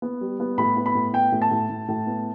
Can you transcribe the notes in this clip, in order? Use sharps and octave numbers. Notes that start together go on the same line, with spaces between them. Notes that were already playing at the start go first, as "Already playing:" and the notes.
B3
G3
B3
A2 B5
B3
B5
A2
B3 G5
A2
A5
A2
A2
A2
B3